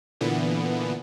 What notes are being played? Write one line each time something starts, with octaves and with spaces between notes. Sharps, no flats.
A#2 D3 E3 B3